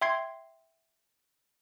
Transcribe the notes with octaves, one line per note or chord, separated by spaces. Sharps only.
E5 G5 C6 G#6 C7